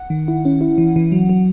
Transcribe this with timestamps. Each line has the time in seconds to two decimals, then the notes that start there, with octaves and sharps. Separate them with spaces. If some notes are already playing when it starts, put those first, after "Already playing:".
Already playing: F#5
0.10 D#3
0.28 E4
0.45 C#4
0.61 E4
0.78 E3
0.96 E3
1.12 F#3
1.29 F#3